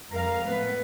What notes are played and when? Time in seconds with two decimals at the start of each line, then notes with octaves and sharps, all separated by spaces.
0.11 F2 G3 A#4 F5
0.47 A2 B3 B4